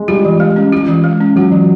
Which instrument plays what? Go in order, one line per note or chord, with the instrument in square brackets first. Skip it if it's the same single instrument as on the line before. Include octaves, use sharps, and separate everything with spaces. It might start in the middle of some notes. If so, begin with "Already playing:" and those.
Already playing: [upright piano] G#3
[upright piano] G3 [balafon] F4
[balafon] E3
G#3
C#4
F4
E3
G#3
C#4
[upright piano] F#3 [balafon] F4
[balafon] E3